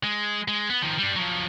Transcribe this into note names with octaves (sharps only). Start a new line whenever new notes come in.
G#3
G#3
B3
D#3 F3
G3 D4
F3 F#3